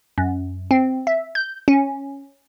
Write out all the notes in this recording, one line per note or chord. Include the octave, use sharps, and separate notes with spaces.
F#2
C4
E5
G6
C#4